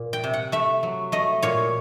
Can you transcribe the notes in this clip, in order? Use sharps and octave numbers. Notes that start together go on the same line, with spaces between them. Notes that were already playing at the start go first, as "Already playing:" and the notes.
Already playing: A#2
G5
C3
F#5
A3 E5
F#3
A3 D#5
A#2 C#5